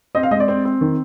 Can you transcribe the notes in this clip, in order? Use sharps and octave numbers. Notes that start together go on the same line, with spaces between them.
C4 D#5
F5
G#3 D#5
D5
C4
C4
D#3